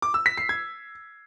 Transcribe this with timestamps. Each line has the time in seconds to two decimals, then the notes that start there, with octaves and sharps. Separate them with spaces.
0.02 D6
0.14 E6
0.26 B6
0.38 C7
0.49 G#6